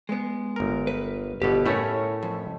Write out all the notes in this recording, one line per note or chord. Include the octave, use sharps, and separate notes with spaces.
G#3 B3
G1 A#4
B4
G1 B2 G4 A4
A2 A3 C#4 E4 A#4 C#5
F2